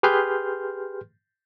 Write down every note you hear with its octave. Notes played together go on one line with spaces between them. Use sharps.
G4 G#4 B4 C6 F6 G6